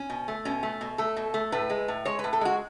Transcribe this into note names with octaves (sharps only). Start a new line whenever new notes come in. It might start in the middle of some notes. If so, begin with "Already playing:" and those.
Already playing: C#4
B2
A3
B2 C#4
A3
B2
A3 A4
B2
A3
A2 B4
G#3
A2
G#3 C#5
B4
A2
A4
G#3 F#4